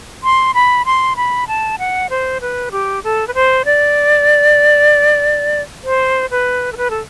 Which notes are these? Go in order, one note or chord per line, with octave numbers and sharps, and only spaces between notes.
C6
B5
C6
B5
A5
F#5
C5
B4
G4
A4
B4
C5
D5
C5
B4
A4
B4
A4